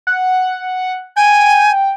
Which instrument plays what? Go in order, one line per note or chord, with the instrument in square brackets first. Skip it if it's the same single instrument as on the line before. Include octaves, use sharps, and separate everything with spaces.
[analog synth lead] F#5
[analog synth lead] G5 [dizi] G#5